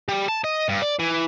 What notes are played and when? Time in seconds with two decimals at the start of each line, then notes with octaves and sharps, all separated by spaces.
0.09 G3
0.28 A5
0.44 D#5
0.69 G2
0.82 D5
0.99 E3